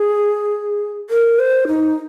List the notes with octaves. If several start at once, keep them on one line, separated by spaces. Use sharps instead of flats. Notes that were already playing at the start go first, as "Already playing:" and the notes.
Already playing: G#4
A#4
C5
D#4